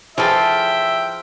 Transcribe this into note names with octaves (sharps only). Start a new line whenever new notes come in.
E3 F3 G#4 A4 E5 G5